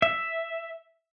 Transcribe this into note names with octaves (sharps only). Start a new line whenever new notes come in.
E5